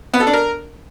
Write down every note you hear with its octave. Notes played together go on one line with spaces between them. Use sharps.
B3
A4
D4
A#4